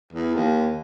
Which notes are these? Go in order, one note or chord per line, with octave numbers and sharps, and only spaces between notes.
E2
D#2